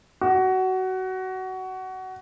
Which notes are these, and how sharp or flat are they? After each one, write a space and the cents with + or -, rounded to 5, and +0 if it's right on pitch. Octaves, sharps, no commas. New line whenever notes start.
F#4 +20